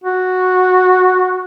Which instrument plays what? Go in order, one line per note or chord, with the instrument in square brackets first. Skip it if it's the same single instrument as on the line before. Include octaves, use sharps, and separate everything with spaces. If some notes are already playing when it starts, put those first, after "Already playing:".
[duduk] F#4